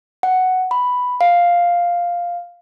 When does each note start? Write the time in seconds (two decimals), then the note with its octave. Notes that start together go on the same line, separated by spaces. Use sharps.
0.23 F#5
0.71 B5
1.21 F5